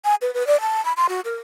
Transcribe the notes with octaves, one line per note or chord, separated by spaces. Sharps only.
G#5
B4
B4
D5
A5
B5
C6
F#4
A#4